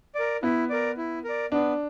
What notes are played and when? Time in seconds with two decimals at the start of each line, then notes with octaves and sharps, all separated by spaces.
0.15 A#4 D5
0.43 B3 E4
0.70 A#4 D5
0.97 E4
1.24 A#4 D5
1.51 B3 D4